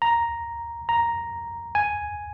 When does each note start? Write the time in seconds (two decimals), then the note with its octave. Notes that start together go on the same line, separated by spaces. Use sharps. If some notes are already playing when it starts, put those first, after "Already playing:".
0.02 A#5
0.89 A#5
1.75 G#5